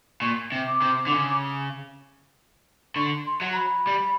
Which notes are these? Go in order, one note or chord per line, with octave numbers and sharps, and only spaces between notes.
A#2 C#6
C3
D6
C3
D3
C#3
D3 C#6
C6
F#3
A#5
B5
G3